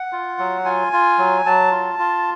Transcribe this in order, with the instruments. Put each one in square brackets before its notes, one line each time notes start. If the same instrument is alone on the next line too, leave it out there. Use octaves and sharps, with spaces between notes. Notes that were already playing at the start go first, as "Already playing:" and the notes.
Already playing: [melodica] F#5
F4
F#3
F4 G#5
F4
F#3
F#3 A5
F4
F4